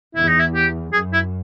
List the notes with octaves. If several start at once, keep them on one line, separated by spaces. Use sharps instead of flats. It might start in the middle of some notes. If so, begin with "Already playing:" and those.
E2 E4
D#4
E4
G4
F#2 G#4
E4